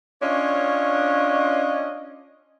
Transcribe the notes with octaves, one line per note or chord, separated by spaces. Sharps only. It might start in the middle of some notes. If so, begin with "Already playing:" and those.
C#4 D4 F4 C#5 D#5